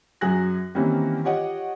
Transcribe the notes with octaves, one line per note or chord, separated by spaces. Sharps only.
F#2 F#3 G#4 G#5 F#6 A#6
D#3 E3 G3 A#3 C4 C#4
F4 G4 C#5 D#5 F#5